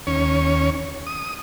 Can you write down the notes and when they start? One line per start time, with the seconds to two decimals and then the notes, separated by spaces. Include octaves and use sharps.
0.07 D#2 C#4 C#5
1.07 D#6